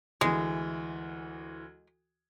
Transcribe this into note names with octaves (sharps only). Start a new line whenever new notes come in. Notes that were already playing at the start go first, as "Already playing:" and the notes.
D2 E3 G#3